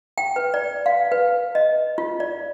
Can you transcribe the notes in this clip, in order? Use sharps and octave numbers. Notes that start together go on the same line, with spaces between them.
G5
B4
D5
F5
B4
D#5
F4
D5